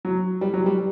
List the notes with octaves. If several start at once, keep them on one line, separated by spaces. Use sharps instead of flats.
F#3
G3
F#3
G3